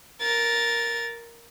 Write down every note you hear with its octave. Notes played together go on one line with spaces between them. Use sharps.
A#4 A6